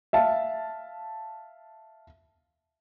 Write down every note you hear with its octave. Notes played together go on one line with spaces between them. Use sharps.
E5 F5 A5